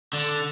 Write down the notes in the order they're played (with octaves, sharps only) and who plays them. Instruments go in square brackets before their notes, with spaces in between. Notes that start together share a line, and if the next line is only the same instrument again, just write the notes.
[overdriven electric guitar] D3